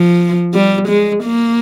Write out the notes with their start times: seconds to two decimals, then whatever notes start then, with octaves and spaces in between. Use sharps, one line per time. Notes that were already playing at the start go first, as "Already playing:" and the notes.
Already playing: F3
0.54 G3
0.88 G#3
1.23 A#3